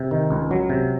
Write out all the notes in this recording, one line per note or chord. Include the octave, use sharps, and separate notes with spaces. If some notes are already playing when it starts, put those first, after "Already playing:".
Already playing: C3
D#3
C#2
F#3
C3